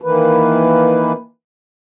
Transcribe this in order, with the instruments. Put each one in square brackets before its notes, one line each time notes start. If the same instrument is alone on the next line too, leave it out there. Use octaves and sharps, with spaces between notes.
[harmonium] D#3 E3 A#3 B4